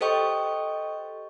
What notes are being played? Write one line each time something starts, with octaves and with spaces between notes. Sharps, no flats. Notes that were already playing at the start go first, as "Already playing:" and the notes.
G4 A4 C5 D#5 G5 C#6